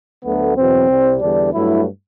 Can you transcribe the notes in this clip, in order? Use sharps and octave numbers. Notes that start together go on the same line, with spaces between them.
D2 D3 F#3 A3 B3
E2 B2 F#3 C4
C2 C3 G3
E2 D3 G3 D4
G2 F#3 A3 E4